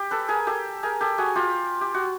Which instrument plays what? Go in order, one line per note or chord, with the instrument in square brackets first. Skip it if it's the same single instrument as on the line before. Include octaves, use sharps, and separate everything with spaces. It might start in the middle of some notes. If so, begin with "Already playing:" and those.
Already playing: [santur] G4
A4 B4
G#4 A#4
G4 A4
G#4 A#4
G4 A4
F#4 G#4
F4 G4
G4
F#4